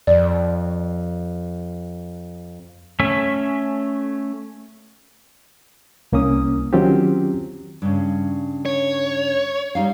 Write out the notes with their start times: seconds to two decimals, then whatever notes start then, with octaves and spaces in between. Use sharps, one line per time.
0.07 F2 D5
3.00 A3 C#4 E5
6.12 C2 A#3 C#4 D#6
6.73 D#3 F#3 C4 C#4 F4 G4
7.82 G2 C#3
8.66 C#5
9.75 G3 D#4 F5